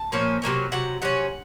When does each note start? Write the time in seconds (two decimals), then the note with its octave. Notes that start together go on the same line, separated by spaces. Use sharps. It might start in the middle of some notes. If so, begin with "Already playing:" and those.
Already playing: A5
0.12 A#2 F3 A#3 C#4
0.42 C3 F#3 A#3 C#4
0.72 C3 F#3 F#5
1.02 C3 F#3 C#4 F#5